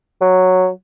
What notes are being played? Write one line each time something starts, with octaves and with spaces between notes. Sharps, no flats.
F#3